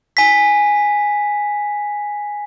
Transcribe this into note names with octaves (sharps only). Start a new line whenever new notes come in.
G#5 B6